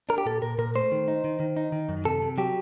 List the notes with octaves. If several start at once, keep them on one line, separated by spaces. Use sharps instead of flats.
D4 A#4
G4
A#2 A4
A#2 A#4
A#2 A#4
A3 C5
D#3
D#4
D#3
D#3
D#4
D#3
F#2
C3 A4
C3
F#3 G4